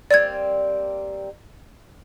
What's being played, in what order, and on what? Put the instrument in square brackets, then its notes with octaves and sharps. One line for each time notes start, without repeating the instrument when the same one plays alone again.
[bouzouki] G3 A#3 C4 [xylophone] D5 G#6